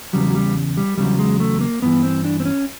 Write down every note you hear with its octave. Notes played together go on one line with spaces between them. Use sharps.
E2 C#3 F#3 G3
F#3
G3
G3
E2 C#3 F#3 G3
G#3
A3
A#3
G2 E3 B3
C4
D4
C4
C#4